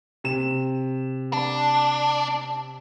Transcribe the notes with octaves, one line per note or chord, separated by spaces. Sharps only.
C3 E7
D4